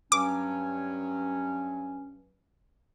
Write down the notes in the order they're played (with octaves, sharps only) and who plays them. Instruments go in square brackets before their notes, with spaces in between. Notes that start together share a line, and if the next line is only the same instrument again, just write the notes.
[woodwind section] G2 F#3 C#4 [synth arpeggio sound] D6